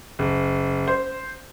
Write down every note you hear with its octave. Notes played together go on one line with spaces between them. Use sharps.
F#1
C5